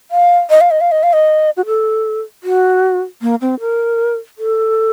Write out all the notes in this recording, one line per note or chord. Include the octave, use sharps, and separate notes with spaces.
F5
D#5
F5
D#5
F5
D#5
F5
D#5
F#4
A4
F#4
A#3
C4
A#4
A4